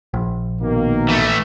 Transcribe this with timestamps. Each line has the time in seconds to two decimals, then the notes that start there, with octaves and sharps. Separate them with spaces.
0.14 A#1
0.61 B2 D#3 A#3
1.09 E3 A3